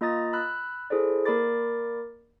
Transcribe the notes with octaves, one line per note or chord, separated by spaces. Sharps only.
A#3 F4 D#5 A#5 D#6 A6
B5 E6 F#6
E4 G#4 A4 C5 D5
A#3 A#4 D5 B5 D6 A6